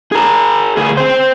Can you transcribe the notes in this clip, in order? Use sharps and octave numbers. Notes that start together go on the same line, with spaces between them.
G#4 A#4
D2 G#4
C4 C5